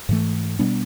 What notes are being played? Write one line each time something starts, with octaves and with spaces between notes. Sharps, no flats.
G#2 E3 A3
B2 G3 B3 D4